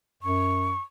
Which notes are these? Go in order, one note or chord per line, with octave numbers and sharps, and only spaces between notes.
F#2 C#6